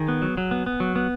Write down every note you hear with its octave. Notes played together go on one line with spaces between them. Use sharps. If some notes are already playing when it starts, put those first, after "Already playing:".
Already playing: D#3 G#4
B3
F#3
F#3
B3
B3
F#3
B3